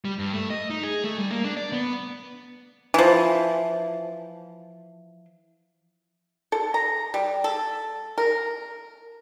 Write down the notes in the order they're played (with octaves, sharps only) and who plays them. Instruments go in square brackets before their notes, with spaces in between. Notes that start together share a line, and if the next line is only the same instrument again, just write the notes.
[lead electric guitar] G3
G2
A3
D#5
D#4
G#4
A3
G3
A#3
D4
D5
B3
[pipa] E3 F3
A4
A#5
G3
A4
A#4